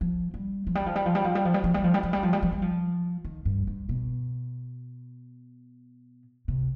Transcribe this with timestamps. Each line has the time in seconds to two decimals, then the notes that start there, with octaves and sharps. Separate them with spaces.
0.01 F3
0.34 G3
0.67 F3
0.75 G3
0.86 F3
0.96 G3
1.06 F3
1.15 G3
1.24 F3
1.35 G3
1.45 F3
1.54 G3
1.64 F3
1.74 G3
1.84 F3
1.94 G3
2.03 F3
2.13 G3
2.23 F3
2.33 G3
2.43 F3
2.52 G3
2.62 F3
3.24 D#3
3.45 G2
3.67 G2
3.89 B2
6.48 C3